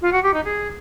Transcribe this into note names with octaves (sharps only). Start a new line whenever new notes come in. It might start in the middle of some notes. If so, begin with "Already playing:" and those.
F4
F#4
G4
D#4
G#4